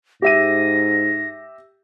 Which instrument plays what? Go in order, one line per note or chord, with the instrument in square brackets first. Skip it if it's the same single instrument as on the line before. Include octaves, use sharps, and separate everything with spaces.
[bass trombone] G#2 [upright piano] G4 E5 D#7 [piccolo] A#6